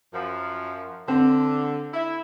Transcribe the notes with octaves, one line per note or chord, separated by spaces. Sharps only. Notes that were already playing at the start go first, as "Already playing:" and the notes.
F#2 F3
D3 C4
E4